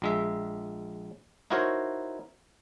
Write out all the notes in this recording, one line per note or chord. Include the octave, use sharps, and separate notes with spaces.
A#1 G#3 E5
D#4 E4 F#4 A#4 C5 C#5